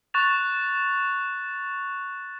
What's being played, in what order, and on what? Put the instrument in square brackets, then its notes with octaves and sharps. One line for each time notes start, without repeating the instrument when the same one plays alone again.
[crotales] C#6 F#6 A6 F7